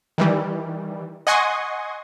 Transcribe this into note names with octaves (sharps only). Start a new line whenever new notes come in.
D#3 E3 G3
D#5 F#5 G#5 C6 C#6 D#6